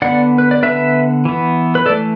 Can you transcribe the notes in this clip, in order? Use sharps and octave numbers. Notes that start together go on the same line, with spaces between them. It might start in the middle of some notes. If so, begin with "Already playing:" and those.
D3 B3 D5 F#5
B4
D5
D3 B3 B4 E5
E3 B3
B4
E3 A3 A4 D5